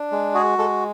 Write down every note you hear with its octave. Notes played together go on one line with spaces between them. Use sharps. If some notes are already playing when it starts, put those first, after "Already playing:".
Already playing: D4
G#3
F#4 G#4
G#3 A4